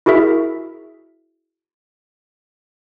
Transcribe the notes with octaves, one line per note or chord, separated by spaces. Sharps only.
E4 F#4 G#4 A#4 E5